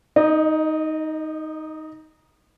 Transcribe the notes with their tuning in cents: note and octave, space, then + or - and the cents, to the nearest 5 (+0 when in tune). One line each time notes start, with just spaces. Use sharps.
D#4 +10 D#5 -30